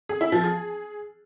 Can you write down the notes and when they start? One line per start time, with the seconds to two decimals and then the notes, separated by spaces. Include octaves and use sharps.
0.09 G#4
0.21 E4
0.32 F3
0.44 G#4